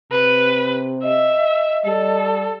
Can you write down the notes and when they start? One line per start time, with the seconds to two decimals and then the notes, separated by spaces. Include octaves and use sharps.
0.12 C3 B4
1.03 D#5 E5
1.85 G3 A4